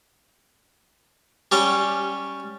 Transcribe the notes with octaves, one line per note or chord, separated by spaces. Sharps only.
G3 C#4 G4 G5